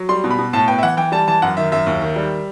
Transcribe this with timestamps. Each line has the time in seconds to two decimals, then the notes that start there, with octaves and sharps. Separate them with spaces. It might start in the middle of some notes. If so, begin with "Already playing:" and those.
Already playing: F#3
0.09 G3 C6
0.24 B2
0.31 B5
0.38 B2
0.53 A2 A5
0.68 B3 G5
0.78 E5
0.83 E3 F#5
0.97 E3 G5
1.12 G3 A5
1.28 E3 A5
1.42 F#2 F#5
1.57 D#3 E5
1.72 F#2 E5
1.86 D#2
2.01 D#3
2.16 G3